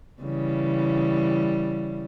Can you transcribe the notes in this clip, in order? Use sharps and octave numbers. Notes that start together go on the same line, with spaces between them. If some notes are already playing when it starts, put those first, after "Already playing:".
C#3 E3 G3